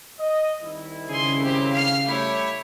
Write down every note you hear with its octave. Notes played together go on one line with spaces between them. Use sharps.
D#5
C2 D#3 E4
C#3 G#4 C6
C4 G4
F5 F6
G3 A3 E4 G4 C#5